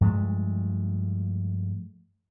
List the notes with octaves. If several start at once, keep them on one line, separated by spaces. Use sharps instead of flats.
G2 F3 G#3 A3